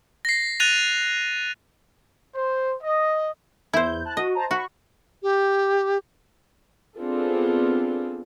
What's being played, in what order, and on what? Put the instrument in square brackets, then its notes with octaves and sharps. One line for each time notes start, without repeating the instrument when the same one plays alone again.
[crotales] A#6 C7
F#6 A6 A#6 D#7 F7
[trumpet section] C5
D#5
[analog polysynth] E2 G6 [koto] E4 C5
[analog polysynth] A5 F#6
[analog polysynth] F#4 [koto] D#5
[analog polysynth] C5 A5 A#5
[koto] F#4 [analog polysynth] B5 C#6
[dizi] G4
[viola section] B3 C4 D4 F4 G#4 A4